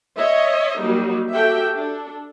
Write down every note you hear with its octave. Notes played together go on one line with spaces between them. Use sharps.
C#5 D#5 E5
F#3 G3 A#3 D#4
F#4 G4 A4 E5 G5
D4 A4